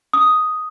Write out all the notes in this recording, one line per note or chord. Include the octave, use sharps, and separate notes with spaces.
D#6